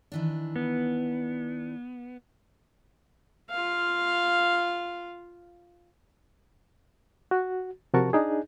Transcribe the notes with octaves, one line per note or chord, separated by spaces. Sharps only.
D#3 E3 D4
B3
F4 F5
F#4
C3 F3 F#4 A#4 A5 C#6
D4 D#4 G#4